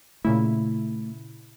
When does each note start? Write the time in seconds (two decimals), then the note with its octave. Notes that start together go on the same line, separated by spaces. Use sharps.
0.25 A#2 C#3 A3 E4